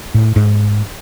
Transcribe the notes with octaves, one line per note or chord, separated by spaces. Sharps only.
A2
G#2